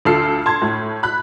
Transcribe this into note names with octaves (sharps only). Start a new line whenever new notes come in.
D2 F4 A4 F6 C7
A5 C6 G#6
A2
B5 F#6